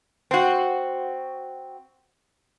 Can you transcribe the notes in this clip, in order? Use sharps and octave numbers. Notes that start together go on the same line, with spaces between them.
C4 F#4